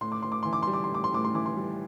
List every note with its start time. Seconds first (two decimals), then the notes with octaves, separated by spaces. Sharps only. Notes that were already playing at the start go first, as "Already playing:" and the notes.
0.01 A2 C6
0.12 D6
0.22 A2 C6
0.32 D6
0.43 E3 C6
0.53 D6
0.63 G3 C6
0.73 D6
0.84 C6
0.90 A2 D6
1.04 C6
1.12 A2 D6
1.24 C6
1.34 E3 D6
1.46 C6
1.57 G3